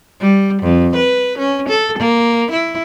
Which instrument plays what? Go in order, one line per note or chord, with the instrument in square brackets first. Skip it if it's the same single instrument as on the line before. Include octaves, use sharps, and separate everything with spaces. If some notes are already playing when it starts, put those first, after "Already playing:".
[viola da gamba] G3
F2
B4
C#4
A4
A#3
E4